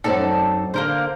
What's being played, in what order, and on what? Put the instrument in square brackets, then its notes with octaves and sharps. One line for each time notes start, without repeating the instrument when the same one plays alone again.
[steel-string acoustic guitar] F#2 C4 D#4 [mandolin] A4 D5
[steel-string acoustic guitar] D3 [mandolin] A#3 A#4 C5